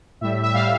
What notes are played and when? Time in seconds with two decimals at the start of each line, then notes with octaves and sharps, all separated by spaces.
0.21 A2 G3 E5
0.43 E5
0.54 A2 G3 F5